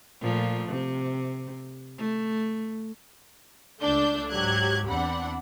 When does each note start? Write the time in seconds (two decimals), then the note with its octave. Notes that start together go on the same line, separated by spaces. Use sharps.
0.21 A#2 F3 A3
0.69 C3
1.97 A3
3.82 C#2 A3 D4 G6
4.30 G#2 F#3 G4 F#6 G#6
4.87 E2 C4 D4 F#5 B5